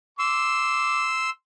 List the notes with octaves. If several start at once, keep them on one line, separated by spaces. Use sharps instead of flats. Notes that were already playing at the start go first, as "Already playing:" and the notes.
C6 D6 E6